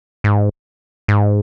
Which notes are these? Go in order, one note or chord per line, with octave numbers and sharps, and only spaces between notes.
G#2
G#2